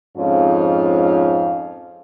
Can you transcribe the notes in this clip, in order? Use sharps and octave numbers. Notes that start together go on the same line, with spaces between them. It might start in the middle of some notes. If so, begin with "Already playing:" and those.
F2 G#2 C#4 F4